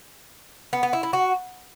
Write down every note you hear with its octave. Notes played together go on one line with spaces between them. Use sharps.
B3
B3
E4
E4
F#4